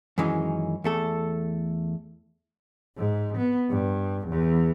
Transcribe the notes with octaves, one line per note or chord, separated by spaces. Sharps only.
F#2 D#3 E3 G#3 C#4
E2 A3 A4
G#2
B3
G2
E2